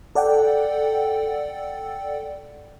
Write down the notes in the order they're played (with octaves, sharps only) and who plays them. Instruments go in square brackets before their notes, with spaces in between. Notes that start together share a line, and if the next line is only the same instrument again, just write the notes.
[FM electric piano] A4 D5 F#5 G5